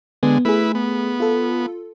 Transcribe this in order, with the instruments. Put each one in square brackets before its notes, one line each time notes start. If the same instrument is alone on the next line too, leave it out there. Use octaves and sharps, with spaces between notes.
[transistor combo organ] D3 G#3 [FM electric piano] B3
[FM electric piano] A3 G#4 [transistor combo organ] E4 B4
[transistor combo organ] B3
[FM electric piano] F4 A4